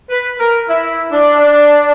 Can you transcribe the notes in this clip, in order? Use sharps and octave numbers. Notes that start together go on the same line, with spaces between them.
B4
A#4
E4
D4